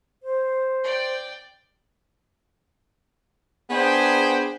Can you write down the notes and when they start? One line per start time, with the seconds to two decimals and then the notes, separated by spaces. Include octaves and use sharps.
0.23 C5
0.83 D5 G5
3.70 B3 D4 G#4 B4 C5 G5